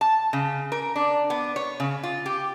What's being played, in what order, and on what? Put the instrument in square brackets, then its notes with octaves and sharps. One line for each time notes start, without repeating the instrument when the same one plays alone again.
[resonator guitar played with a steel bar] A5
C#3
A#4
D4
B3
C#5
C#3
F4
G4